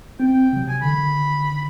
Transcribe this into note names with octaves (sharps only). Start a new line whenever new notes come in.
C4 G5
C3 F#3
G#5
D3 D#3 B5